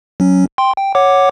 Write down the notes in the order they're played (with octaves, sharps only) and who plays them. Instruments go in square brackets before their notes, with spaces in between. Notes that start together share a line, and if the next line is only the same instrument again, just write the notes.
[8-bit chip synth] F#3 C#4
G5 C6
G5
C#5 F#5 D6